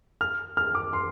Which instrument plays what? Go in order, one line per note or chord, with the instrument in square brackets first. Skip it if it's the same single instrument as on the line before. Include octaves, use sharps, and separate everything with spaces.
[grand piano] F6
F6
D6
C6